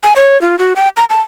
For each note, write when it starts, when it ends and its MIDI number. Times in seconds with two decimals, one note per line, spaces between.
0.03 0.13 80
0.16 0.40 73
0.41 0.58 65
0.59 0.73 66
0.76 0.88 79
0.97 1.05 82
1.10 1.20 81